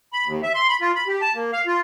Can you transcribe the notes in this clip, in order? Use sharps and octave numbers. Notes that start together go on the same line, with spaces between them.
B5
D#2
E5
C6
B5
F4
B5
G4
A5
A#3
F5
F4